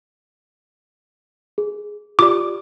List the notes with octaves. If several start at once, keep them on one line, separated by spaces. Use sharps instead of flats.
G#4
F4 G4 D5 D6